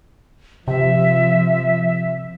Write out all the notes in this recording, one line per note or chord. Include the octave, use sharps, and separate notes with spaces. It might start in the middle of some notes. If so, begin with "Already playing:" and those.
C3 F3 E5